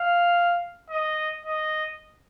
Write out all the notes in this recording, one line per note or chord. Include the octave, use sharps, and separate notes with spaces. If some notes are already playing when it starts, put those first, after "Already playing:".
Already playing: F5
D#5
D#5